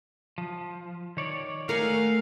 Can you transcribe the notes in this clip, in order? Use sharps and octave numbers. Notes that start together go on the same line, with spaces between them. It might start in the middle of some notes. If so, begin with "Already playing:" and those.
F3
D#3 C#5 D5
A3 A#4 F5 F#5 G#5